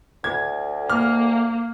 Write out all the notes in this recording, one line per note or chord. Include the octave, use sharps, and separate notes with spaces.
D2 G#6
A#3 F6